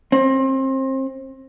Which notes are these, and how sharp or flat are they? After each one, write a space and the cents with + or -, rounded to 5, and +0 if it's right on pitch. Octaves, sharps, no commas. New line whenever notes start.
C4 +30